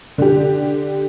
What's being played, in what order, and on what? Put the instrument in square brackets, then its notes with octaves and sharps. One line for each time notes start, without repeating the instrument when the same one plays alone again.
[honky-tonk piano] D3 G4